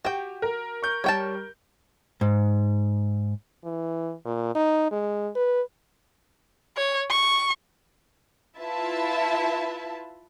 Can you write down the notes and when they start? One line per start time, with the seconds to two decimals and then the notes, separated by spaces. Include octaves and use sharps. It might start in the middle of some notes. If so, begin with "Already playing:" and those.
0.05 F#4 G4 G5
0.42 A#4
0.83 C#6 G6
1.04 G3 C#5 G5 A5 C#6
2.21 G#2
3.64 E3
4.25 A#2
4.55 D#4
4.91 G#3
5.35 B4
6.77 C#5
7.10 C#6
8.59 E4 F4 B4 E5 A5